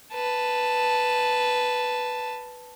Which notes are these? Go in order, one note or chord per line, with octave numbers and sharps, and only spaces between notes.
B4 A5